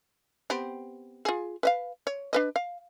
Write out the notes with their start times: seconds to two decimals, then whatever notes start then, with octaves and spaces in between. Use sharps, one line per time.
0.50 B3 C4 G4
1.25 F4 G#4
1.63 B4 D#5 F5
2.07 C#5
2.33 D4 B4 D#5
2.56 F5